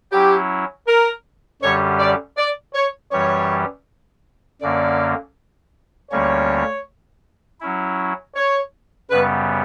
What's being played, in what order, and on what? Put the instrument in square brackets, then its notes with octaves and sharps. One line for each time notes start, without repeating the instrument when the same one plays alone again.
[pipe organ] F#3 C#4 E4 [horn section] G4
[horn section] A#4
[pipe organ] F#2 D3 G3 C#4 G4 [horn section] C#5
[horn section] D5
D5
C#5
[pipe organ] F#2 E3 G3 C#4 G4 [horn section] C#5
[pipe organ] F#2 D3 A#3 C#4 [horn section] D5
[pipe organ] D2 D3 G3 A#3 C#4 [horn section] C#5
[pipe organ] F#3 C#4 E4
[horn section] C#5
[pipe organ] F#2 C#3 G3 B3 [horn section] B4